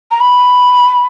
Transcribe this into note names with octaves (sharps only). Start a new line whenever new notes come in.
A#5
B5